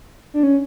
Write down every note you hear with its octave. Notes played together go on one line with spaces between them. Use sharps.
D4
C#4